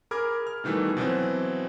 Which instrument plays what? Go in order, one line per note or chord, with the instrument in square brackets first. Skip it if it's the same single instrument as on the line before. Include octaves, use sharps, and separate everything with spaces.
[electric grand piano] G#4 A#4 B5 D6 F6 G#6
F6
B2 D#3 E3 G3 A3
B2 E3 F#3 C4